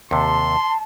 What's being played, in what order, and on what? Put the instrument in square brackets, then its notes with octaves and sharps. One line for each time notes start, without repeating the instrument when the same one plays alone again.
[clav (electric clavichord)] D#2 C3 [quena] A5 [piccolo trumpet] C6